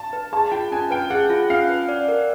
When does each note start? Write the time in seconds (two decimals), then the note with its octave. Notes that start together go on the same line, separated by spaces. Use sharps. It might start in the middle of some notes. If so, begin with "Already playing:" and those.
Already playing: A5
0.13 B4
0.32 G#4 A5
0.52 F4 G5
0.72 C#4 G#5
0.91 B4 G5
1.10 G#4 F#5
1.30 F4
1.50 C#4 F5
1.69 B4
1.89 D5
2.08 A#4